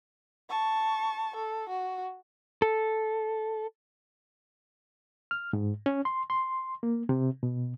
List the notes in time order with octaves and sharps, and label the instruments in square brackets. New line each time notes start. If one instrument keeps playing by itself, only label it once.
[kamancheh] A5 C#6
A4
F#4
[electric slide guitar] A4
[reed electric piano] F6
G#2
C#4
C6
C6
A#3
C3
B2